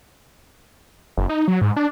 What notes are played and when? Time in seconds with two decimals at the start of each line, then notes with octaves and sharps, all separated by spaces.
1.17 F#1
1.29 D#4
1.48 F#3
1.61 G#2
1.76 D4